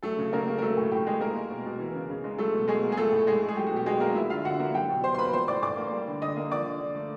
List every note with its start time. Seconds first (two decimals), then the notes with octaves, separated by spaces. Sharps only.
0.03 F#3 A3 A4
0.18 C#3
0.33 C#3 A#3 A#4
0.47 A#3
0.58 A#4
0.62 F#3 A3 A4
0.77 A2
0.91 A2 G4
1.06 G#3 A#3 G#4
1.21 G#3 A#3 A#4
1.36 G#3
1.50 B2
1.66 B2
1.79 E3
1.94 C#3
2.10 C#3
2.24 G#3
2.38 F#3 A3 A4
2.54 B2
2.68 B2 G#3 G#4
2.83 A#3
2.92 G#4
2.97 F3 A3 A4
3.12 A2
3.27 A2 G#3 G#4
3.42 A3
3.49 G#4
3.57 F#3 G4
3.67 F#4
3.71 B2 G4
3.86 B2 G#3 G#4
4.00 A#3 A#4
4.15 F3 E4 E5
4.30 D3 F4 F5
4.45 D3 F#4 F#5
4.60 A#3
4.74 F#3 G4 G5
4.89 B2
5.04 B2 C5 C6
5.14 C6
5.18 A#3 B4 B5
5.33 F3 C5 C6
5.48 A2 D5 D6
5.63 A2 D5 D6
5.77 A#3
5.92 G3
6.07 D3
6.22 D3 D#5 D#6
6.37 A#3
6.51 F3 D5 D6
6.66 D3
6.80 D3
6.95 A3